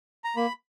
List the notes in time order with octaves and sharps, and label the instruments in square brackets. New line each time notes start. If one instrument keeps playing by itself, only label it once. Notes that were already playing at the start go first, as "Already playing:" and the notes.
[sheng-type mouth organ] A#5
A#3 B5